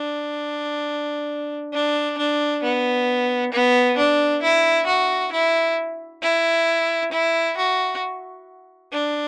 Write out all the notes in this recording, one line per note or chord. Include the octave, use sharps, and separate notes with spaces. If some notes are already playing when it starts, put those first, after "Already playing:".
Already playing: D4
D4
D4
B3
B3
D4
E4
F#4
E4
E4
E4
F#4
D4